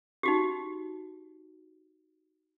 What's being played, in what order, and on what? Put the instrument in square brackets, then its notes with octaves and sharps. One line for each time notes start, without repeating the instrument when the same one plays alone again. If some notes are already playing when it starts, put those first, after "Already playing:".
[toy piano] D#4 F#4 G4